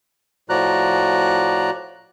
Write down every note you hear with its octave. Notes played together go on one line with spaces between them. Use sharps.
A2 F3 F#4 D5 A#5 F#6